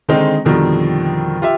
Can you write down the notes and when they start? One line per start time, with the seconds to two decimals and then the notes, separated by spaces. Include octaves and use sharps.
0.09 D3 D#3 G#3 C4 D#4
0.45 F2 B2 D3 D#3 F3 G3
1.42 F4 G4 E5